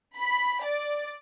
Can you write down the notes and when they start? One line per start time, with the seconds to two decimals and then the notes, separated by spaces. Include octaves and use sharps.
0.17 B5
0.64 D5